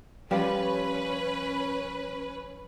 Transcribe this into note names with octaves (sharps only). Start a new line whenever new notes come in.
F3 G3 C#4 B4